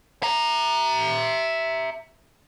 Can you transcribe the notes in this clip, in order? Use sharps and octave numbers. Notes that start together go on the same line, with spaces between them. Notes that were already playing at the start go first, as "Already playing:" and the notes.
E5 A#5